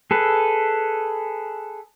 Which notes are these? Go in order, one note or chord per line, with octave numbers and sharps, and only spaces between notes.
G#4 A4 B4